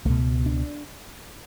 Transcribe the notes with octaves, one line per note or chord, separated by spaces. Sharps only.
C#2 B2 A3
D4